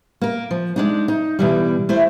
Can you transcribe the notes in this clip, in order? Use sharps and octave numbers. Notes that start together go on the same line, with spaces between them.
A#3 A#4
F3
G#3 D4 D#4
D#4
B2 E3 G3
A3 E4 C5